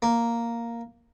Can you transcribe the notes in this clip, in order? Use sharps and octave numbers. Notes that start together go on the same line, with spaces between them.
A#3